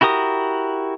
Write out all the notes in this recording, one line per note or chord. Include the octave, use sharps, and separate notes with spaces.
E4 F#4 G4 A#4 D#6